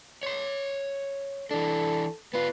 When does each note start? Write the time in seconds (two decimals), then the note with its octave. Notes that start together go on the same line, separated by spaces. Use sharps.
0.23 C#5 C6
1.51 E3 D4 A4
2.34 B3 F4 B4